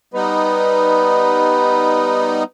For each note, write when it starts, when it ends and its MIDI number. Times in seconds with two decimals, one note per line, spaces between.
0.14 2.44 55
0.14 2.44 59
0.14 2.44 63
0.14 2.49 71